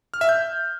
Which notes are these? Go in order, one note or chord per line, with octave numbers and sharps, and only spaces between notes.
F6
E5
G6